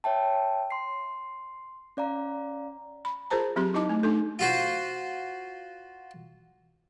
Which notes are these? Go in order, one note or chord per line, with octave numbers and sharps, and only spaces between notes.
C#5 E5 G5 A5
C6 C7
C#4 D5 F5 A#5
B5
F4 G#4 A#4 C5 A5 A#5
F#3 C4 G4 C6
D#4 E4 D#5 A5 D6
A3
A3 D4 D#4 A4
F4 F#4 C5